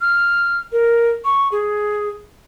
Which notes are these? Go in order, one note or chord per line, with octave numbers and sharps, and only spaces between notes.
F6
A#4
C#6
G#4